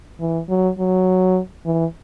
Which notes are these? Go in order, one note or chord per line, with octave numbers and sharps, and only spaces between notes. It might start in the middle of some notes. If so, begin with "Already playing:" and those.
E3
F#3
F#3
E3